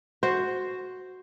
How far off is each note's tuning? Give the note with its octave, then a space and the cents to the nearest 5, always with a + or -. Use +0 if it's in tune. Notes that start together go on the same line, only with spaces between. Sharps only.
F#4 +0 C5 +0